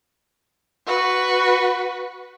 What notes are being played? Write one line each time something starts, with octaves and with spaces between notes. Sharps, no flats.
F#4 B4